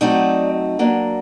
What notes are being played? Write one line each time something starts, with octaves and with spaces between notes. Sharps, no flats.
F#3 A3 C4 D#4 D5
F#3 A#3 D4